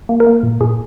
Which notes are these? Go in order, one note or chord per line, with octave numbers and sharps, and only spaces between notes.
A#3
A#4
A#3
A#2
A#2 G#4